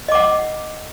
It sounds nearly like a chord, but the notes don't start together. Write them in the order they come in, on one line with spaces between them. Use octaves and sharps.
D#5 D6 F#5